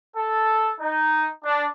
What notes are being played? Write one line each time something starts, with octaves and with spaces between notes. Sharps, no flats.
A4
D#4
D4